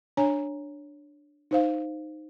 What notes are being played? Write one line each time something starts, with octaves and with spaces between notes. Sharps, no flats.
D4 C#5 G#5 A#5
D#4 C5 F5